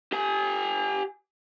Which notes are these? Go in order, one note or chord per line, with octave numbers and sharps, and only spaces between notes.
G4 G#5